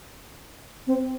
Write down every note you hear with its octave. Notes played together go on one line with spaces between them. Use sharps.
C4